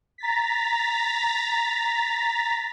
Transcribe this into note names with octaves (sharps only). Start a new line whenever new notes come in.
A#5 A6 B6